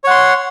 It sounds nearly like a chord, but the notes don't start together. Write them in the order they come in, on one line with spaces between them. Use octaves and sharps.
C#5 F#5 C6